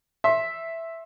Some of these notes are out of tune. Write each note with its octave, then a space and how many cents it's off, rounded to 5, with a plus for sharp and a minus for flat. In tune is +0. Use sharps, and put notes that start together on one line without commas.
E5 +0 C6 +25